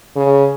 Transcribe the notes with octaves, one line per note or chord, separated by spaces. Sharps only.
C#3